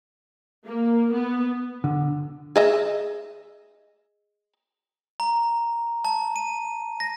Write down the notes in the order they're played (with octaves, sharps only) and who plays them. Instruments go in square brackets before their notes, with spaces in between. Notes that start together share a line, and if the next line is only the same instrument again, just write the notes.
[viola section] A#3
B3
[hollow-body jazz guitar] D3
[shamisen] G#4 D#5 E5
[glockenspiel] A#5
A5
D#7
A#6